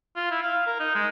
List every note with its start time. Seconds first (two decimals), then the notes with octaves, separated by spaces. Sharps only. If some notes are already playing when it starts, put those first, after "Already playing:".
0.16 F4
0.31 E4
0.43 F5
0.67 A#4
0.80 D#4
0.95 G#3